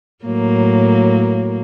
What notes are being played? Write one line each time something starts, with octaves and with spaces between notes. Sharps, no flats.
A2 F#3 A#3